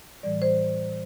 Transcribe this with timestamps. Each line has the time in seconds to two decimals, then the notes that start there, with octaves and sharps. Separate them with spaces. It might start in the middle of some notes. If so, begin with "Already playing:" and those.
0.23 A2 E3 G3 D5
0.42 C5